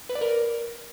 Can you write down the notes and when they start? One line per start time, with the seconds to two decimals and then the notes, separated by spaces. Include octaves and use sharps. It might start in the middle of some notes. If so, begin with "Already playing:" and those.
0.09 B4
0.15 D5
0.21 A#4